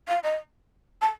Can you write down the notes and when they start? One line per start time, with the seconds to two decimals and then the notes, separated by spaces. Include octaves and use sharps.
0.08 F5
0.23 D#5
1.01 A5